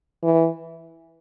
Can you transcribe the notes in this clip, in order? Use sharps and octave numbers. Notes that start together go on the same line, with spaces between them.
E3